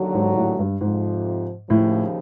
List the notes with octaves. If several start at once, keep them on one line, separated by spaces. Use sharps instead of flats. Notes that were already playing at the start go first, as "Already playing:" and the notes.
Already playing: D#2 D3 F#3
G#2
A2
G2
F2 G#2 C3 F3
D#2 A2 C#3 F3